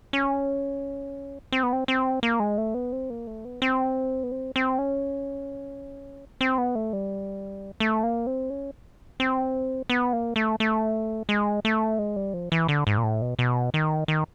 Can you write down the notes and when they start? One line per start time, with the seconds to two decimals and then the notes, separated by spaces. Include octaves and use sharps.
0.13 C#4
1.52 C4
1.63 B3
1.73 C4
1.88 C4
2.23 A#3
2.40 G#3
2.58 A3
2.74 B3
2.92 C4
3.10 A#3
3.27 A3
3.45 B3
3.62 C4
4.23 B3
4.32 C4
4.56 C4
4.79 C#4
6.41 C4
6.58 B3
6.75 A3
6.93 G3
7.80 A3
8.03 A#3
8.27 C4
8.50 C#4
9.20 C4
9.90 B3
10.13 A#3
10.36 A3
10.60 A3
11.29 G#3
11.65 A3
11.99 G#3
12.16 G3
12.34 F3
12.52 E3
12.68 D3
12.87 G#2
12.98 A#2
13.04 A2
13.22 B2
13.39 B2
13.74 D#3
14.08 D#3